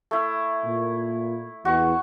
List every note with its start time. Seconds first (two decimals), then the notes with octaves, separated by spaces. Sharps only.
0.11 A3 E4
0.65 A#2
1.65 E2 F#4 C#6